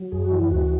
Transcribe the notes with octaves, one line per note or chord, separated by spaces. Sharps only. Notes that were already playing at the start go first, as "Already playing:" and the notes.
Already playing: F#3
F#2 G#4
F#4
E3
E4
D2 F#4